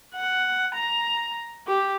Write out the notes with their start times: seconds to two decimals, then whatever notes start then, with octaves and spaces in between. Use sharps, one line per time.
0.15 F#5
0.74 A#5
1.67 G4